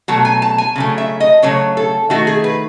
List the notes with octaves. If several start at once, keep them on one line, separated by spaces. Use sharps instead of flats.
B2 F#3 A3 F#5
G#5
A5
G#5
C#3 F#3 A3
E5
D#5
C#3 F#3 A3 C#5
A4
D#3 A3 F#4
G#4
B4